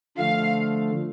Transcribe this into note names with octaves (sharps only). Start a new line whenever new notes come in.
D3 F3 A3 F5